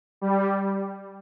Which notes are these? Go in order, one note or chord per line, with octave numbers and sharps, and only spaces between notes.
G3